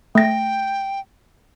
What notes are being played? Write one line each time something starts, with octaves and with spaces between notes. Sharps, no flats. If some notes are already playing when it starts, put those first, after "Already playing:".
A3 G5 A#6